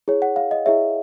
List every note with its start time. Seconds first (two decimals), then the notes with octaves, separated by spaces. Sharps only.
0.08 E4 G#4 C#5
0.22 F#5
0.36 F5
0.51 D#5
0.66 E4 G#4 C#5 E5